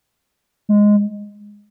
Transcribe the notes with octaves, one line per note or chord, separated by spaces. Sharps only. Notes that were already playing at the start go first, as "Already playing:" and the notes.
G#3